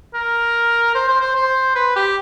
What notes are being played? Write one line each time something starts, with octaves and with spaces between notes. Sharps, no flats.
A#4
C5
C5
C5
C5
B4
G4